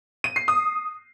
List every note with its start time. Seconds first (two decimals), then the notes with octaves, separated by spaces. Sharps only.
0.24 D#7
0.36 C7
0.48 D#6